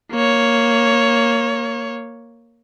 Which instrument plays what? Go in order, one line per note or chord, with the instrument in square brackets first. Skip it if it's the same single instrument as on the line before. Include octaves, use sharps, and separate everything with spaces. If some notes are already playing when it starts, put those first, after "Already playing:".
[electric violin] A#3 C#5